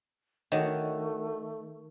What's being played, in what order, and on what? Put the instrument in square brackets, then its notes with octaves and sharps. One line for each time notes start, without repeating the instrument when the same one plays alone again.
[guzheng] D#3 [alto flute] A3 [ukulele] D4 F#4 C#5 [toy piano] D#5